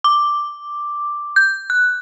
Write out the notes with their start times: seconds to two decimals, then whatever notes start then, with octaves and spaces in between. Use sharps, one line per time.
0.04 D6
1.36 G6
1.70 F#6